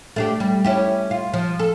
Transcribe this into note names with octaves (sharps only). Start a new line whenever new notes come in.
A3 D4 G4
G3
C#4 E4 G4
F4
F3
A4